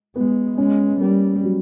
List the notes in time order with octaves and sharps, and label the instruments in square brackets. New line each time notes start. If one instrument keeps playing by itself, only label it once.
[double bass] G#3 [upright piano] B3
[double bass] G#3 [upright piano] C#4
[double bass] G3 [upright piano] A#3
[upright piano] F#3